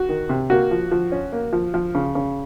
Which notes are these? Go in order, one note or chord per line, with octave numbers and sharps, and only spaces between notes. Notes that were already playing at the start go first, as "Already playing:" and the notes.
Already playing: F#4
D#3
C3
A#3 F#4
F3
F3
C#4
A#3
F3
F3
C#3
C#3